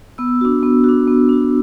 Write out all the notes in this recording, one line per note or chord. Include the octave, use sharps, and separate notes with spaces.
B3 E6
D4 F#4
B3
D4 F#4
B3
D4 F#4